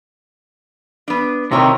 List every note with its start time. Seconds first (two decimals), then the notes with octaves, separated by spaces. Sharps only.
1.08 B3 D4
1.51 C3 D#3 C4 E4 C#5